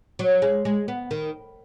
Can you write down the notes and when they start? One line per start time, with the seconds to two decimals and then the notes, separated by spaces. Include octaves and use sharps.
0.19 F#3
0.42 G#3
0.65 G#3
0.88 B3
1.11 D#3